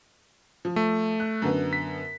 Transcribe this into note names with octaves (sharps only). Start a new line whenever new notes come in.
F3
A3
F#6
F#2 D3 B3
B6